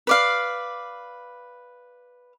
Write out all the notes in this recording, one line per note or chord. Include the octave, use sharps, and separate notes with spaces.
B4 D5 F5